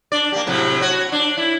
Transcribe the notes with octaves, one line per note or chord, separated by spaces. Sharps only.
D4 D5
A#3 G4
A2 C3 F#3
F#4 C#5
D4
E4